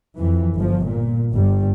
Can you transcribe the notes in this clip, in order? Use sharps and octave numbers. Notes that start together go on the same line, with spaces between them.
F2 E3
G1 F3
A#2
G1 G2 G3